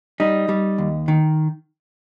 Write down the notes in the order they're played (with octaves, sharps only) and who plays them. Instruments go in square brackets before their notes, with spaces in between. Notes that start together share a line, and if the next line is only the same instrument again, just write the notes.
[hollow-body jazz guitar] G3 D#4
G3
D#2
D#3